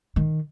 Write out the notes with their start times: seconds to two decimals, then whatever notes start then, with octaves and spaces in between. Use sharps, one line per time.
0.16 D#3